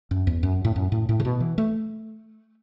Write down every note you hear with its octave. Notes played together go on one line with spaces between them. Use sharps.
F#2
E2
F#2
A2
F#2
A2
A2
C#3
B2
E3
A3